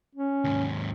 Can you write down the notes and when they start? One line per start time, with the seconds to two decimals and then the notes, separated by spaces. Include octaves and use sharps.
0.15 C#4
0.45 D#2 G#2